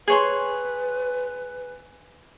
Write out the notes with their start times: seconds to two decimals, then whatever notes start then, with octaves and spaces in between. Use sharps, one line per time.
0.08 G#4 B4 C#5 C6